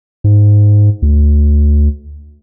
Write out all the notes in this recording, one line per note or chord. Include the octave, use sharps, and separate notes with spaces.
G#2
D2